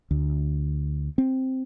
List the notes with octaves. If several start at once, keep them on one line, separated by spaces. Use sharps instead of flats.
D2
C4